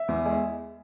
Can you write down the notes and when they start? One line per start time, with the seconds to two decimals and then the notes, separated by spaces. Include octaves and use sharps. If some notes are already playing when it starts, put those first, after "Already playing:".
Already playing: E5
0.08 E2
0.25 G#3